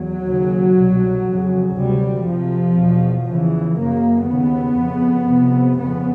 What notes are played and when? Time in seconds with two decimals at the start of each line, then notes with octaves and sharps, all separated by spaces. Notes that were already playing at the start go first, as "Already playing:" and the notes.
Already playing: E2 F#3
0.27 D#2 C#3
0.78 C2 B2
1.27 F2 C#3
1.77 D2 C3 G3
2.27 F2 C3 F3
2.78 E2 B2
3.28 E2 C#3 E3
3.78 F#2 C#3 A#3
4.29 D#2 C#3 B3
4.79 F2 C#3
5.29 F2 C3
5.79 F2 C#3 B3